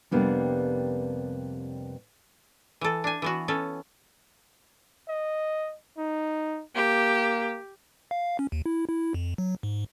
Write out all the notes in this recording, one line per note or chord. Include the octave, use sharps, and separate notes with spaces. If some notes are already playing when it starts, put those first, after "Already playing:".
F2 C3 G3 A#3 B3 D4
E3 A4
D4 G#5
E3 B3 F#4
B3 C#4 A4
D#5
D#4
A#3 G4
F5
C#4
D#2
E4
E4
F2
F#3
G#2